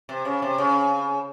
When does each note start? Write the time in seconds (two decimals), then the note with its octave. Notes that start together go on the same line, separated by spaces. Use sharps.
0.09 C3
0.25 C#3
0.42 C3
0.58 C#3